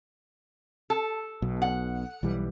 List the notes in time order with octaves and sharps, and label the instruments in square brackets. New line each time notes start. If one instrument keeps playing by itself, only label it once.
[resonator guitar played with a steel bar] A4
[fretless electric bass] B1 B2
[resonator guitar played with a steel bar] F#5
[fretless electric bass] B1 E3 G3